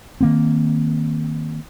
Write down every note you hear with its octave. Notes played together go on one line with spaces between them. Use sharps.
D#3 A#3 C4